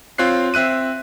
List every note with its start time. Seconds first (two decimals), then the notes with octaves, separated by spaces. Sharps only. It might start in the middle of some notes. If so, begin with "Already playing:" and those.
0.18 C4 F4 C#5 F#6 C7
0.54 C4 E5 F#6 D#7